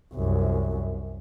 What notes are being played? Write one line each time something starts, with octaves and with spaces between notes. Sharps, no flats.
C2 F#2